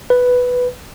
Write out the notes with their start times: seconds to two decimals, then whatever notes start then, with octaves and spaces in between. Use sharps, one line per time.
0.10 B4